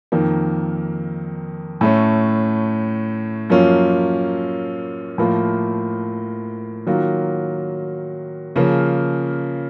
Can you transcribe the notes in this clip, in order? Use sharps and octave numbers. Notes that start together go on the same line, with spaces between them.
F2 D#3 A#3
A2 A3 C#4
F#2 F3 A#3 C#4 F4
A2 F3 A#3 F4
D#3 F#3 A#3 F4
C#3 F3 A#3